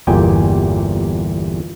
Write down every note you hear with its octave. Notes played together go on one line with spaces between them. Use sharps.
G1 E2 A#2 G4 G5 G#5